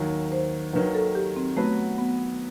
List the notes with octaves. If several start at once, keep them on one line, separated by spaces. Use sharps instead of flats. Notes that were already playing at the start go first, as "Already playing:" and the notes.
Already playing: D#2 D#3 F#3
C5
D#2 D#3 F#3 B4
A4
G4
C4
F#3 A3 B3 F#4 B4
B3